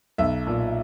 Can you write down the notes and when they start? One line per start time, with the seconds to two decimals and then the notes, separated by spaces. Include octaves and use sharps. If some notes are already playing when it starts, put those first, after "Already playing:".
0.18 B1 E5
0.47 A#2